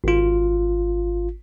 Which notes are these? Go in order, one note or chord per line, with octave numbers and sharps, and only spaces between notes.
G#1 F4